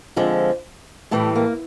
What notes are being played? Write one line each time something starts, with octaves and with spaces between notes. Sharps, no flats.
F2 D3 F3 G#3
A2 E3 G3 A3
A#3